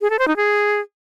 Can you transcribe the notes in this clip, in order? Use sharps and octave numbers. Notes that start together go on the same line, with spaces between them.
G#4
A4
C5
D#4
G#4